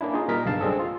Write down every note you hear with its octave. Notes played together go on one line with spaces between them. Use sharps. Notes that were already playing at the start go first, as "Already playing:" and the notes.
A#3 C#4 D4 E4
D#4 F4 G#4
A#2 G3 A#4 D#5 B6
B1 G2 C#3 F5 A5
G3 G#3 C4 D4 G#4 A4
F4